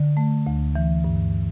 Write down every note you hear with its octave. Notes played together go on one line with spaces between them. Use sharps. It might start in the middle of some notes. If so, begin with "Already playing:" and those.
Already playing: D3
A3
D2
E3
G2